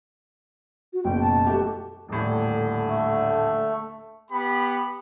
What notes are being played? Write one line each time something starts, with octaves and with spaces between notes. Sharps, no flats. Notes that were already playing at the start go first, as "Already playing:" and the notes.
F#4
F#1 B2 G5
A5
A3 F#4 G4
D#1 A2 D3
A3
B3 G4 B5